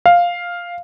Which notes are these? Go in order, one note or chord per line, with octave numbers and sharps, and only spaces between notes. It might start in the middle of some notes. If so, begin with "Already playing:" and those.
F5